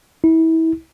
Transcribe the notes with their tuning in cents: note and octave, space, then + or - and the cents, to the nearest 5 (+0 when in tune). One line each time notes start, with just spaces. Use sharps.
E4 -30